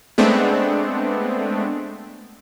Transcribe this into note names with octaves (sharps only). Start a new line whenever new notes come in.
G#3 A3 B3 C4 D4